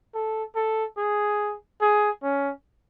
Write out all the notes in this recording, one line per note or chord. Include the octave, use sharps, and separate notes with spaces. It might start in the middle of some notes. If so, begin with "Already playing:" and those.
A4
A4
G#4
G#4
C#4